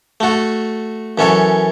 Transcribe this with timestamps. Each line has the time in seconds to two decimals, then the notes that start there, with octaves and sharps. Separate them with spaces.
0.20 A3 F#4 A4
1.18 F#2 E3 C#4 A4 C#5